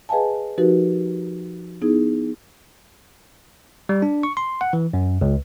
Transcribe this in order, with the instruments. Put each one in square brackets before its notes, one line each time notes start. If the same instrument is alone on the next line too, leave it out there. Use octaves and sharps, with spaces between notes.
[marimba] G#4 B4 D#5 F5 G#5 A5
F3 D#4 F#4 G4 A#4 B4
B3 D#4 E4 G#4
[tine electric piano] G3
D4
C#6
C6
F#5
E3
F#2
C#2